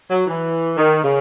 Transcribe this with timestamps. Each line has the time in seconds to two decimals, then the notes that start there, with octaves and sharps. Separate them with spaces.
0.09 F#3
0.26 E3
0.77 D#3
1.03 C#3